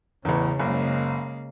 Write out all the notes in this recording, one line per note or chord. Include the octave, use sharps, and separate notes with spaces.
A1 E2 C#3
F#1 G#3 A#3